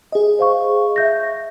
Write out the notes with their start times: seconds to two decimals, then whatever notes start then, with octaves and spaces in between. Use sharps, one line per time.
0.12 G#4 D#5
0.39 C5 F5 C#6
0.96 E5 G6 A#6